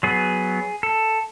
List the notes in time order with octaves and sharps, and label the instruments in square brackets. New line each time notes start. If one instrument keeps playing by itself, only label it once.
[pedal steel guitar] F#3 B3 G#4
A4